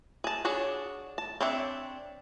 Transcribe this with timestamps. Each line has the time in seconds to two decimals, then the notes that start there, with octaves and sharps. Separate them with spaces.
0.24 G#4 A5
0.45 D4 F#4 G#4 C#5
1.18 A5
1.41 C4 D4 C#5 E5